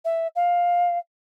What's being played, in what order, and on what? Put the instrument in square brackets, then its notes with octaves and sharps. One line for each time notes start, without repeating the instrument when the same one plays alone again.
[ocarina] E5
F5